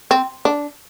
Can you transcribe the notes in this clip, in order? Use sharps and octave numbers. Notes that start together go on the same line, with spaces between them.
C4
D4